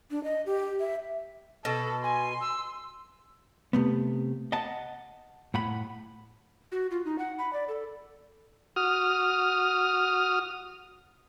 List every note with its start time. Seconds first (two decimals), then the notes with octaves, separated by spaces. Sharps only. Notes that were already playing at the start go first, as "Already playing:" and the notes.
0.11 D4
0.24 D#5
0.46 G4
0.80 E5
1.65 B2 A4
2.03 G#5 C6
2.40 E6
3.73 C3 A3 B3
4.52 D#5 F#5 A5
5.54 A2 F#5 B5
6.72 F#4
6.91 F4
7.05 D#4
7.18 F#5
7.38 B5
7.53 D5
7.68 A4
8.76 F#4 D#6 F6